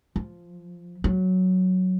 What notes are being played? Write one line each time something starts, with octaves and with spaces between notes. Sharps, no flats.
F3
F#3